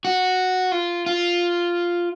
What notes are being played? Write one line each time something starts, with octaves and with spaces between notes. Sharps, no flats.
F#4
F4
F4